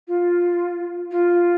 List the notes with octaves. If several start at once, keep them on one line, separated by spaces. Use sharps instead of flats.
F4
F4